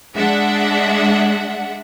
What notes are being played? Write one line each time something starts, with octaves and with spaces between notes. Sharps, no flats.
G#3 D4 E5 F#5